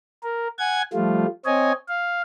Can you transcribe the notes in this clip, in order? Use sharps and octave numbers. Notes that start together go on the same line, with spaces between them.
A#4
F#5 G#5 G#6
F3 G3 A3 F4
C4 C#5 D#5 G#5
F5